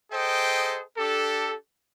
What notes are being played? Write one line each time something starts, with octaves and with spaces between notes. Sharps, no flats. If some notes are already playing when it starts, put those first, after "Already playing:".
G#4 A4 C5 D#5 G5
D4 G4 A4